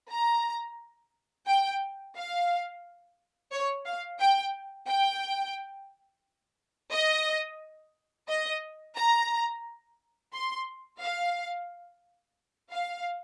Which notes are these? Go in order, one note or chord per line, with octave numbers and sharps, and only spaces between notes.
A#5
G5
F5
C#5
F5
G5
G5
D#5
D#5
A#5
C6
F5
F5